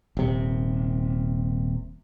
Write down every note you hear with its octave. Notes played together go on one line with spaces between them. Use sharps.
D#1 C3